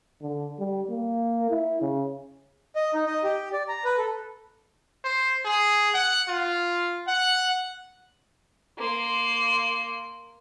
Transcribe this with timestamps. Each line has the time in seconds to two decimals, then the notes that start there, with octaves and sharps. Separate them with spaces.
0.22 D3
0.59 G3
0.90 A#3
1.51 E4
1.82 C#3
2.76 D#5
2.94 D#4
3.07 D#5
3.24 G4
3.53 D5
3.68 A#5
3.85 B4
3.98 A4
5.04 C5
5.45 G#4
5.94 F#5
6.28 F4
7.07 F#5
8.78 A#3 C6